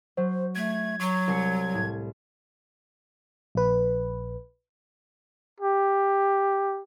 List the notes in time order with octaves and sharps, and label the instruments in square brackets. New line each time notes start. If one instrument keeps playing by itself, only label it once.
[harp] F#3 [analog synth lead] C5
[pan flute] A3 [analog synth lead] G#6
[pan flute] F#3 [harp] C#6
[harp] C2 C7 C#7
A2
[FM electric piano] A#1 B4
[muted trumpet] G4